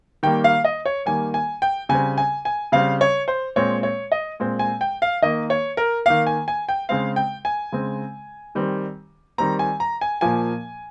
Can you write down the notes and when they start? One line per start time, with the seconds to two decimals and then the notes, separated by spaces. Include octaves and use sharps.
0.23 D#3 G3 A#3 G5
0.44 F5
0.64 D#5
0.86 C#5
1.06 D#3 G3 A#3 G#5
1.34 G#5
1.62 G5
1.89 C#3 G3 C4 G#5
2.18 G#5
2.45 G#5
2.72 C#3 G3 C4 F5
3.01 C#5
3.28 C5
3.56 A#2 G#3 C4 C#5
3.83 C#5
4.12 D#5
4.40 A#2 G#3 C4
4.59 G#5
4.81 G5
5.02 F5
5.22 D#3 A#3 D#5
5.50 C#5
5.77 A#4
6.06 D#3 A#3 F5
6.27 G#5
6.48 G#5
6.69 G5
6.89 C#3 G#3 C4 F5
7.16 G5
7.45 G#5
7.72 C#3 G#3 C4
8.55 D#3 G3 C4
9.38 D#3 G3 C4 A#5
9.59 G#5
9.80 A#5
10.01 G#5
10.21 A#2 F3 A#3 G#5